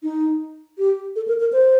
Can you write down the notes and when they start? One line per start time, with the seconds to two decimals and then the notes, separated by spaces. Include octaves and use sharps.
0.03 D#4
0.78 G4
1.16 A4
1.28 A#4
1.40 A#4
1.53 C5